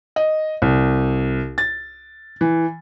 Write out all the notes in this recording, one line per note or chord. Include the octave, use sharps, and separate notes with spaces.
D#5
C2
A6
E3